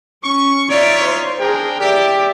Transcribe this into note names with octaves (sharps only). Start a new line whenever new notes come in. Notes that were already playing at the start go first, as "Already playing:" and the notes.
C#4 C#6
D#4 F4 C#5 D5 E5
C5
D4 G#4 A#4 G5
G4 D5 E5